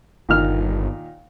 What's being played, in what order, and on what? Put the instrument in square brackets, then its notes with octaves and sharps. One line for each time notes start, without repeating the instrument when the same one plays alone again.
[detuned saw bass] G1 [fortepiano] A#2 D#3 F6